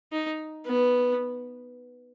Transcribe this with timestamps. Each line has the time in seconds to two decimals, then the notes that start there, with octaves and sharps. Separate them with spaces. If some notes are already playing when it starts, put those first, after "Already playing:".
0.12 D#4
0.66 B3